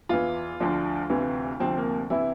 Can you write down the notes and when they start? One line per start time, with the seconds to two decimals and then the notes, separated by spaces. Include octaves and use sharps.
0.09 E2 E3 F4
0.60 D2 D3 F3
1.10 D2 C3 E3
1.60 D2 C3 F3 C4
1.77 A#3
2.10 C3 E3 E4